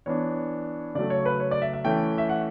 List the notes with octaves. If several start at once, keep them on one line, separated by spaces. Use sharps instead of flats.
E3 B3 D4 C#5
C#3 F#3 A3 D5
C#5
B4
C#5
D5
E5
E5
E3 A3 C#4 G5
E5
F#5